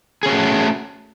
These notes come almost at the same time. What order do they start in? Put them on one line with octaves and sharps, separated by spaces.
G#4 C#4 F#4 A3